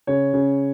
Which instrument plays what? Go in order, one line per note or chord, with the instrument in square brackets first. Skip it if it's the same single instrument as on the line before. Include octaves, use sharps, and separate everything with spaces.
[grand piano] C#3 C#5
C#3